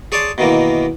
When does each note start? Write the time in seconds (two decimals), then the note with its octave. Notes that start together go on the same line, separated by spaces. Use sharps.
0.12 G#4 C#5 D5 A5 C6
0.38 B2 D#3 E3 A#3